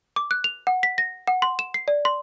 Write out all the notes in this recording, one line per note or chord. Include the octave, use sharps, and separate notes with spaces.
D6
F#6
F7
F#5
B6
A#6
F#5
C6
E7
C7
D5
C6